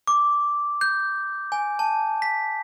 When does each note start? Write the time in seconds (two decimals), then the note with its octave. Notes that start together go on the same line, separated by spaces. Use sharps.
0.07 D6
0.81 G6
1.52 G#5
1.79 A5
2.22 B6